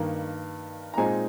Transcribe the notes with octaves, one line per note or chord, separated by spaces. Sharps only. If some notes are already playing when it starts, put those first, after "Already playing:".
Already playing: G2 D#3 A#3 D#4
A#5
A#2 G#3 C4 D#4 G#5